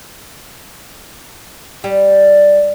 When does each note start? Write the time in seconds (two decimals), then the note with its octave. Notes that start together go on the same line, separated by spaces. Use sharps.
1.84 G3